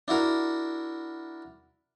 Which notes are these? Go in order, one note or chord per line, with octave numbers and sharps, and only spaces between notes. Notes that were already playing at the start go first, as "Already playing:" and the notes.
D4 E4 F#4 A#4